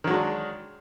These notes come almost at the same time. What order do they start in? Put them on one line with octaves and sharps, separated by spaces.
D#3 F#3 G#3 D4